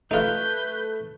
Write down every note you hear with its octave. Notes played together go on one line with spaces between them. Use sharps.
A3 D#4 F4 B4 G6